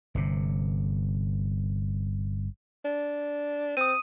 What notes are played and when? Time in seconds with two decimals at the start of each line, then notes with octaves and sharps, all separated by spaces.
0.15 G1 C3
2.85 D4
3.77 C4 D#6 D#7